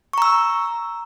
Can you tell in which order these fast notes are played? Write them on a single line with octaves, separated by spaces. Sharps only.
C#6 A#5 E6